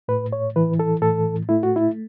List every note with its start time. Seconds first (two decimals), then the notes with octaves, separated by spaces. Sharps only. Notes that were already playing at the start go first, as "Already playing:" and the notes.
0.08 A2 B4
0.33 C#5
0.56 E3 B4
0.79 A4
1.02 A2 A4
1.49 A3 E4
1.63 F#4
1.76 E4